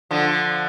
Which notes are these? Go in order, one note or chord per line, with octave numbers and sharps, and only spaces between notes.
D3 F3